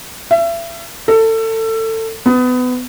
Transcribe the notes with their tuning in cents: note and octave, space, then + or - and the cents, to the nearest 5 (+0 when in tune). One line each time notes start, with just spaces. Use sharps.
E5 +35
A4 +25
B3 +25